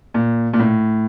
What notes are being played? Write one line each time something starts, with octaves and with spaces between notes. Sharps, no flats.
A#2
A#2
A2